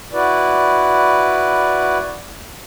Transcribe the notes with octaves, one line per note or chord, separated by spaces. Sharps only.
E4 F#4 B4 D5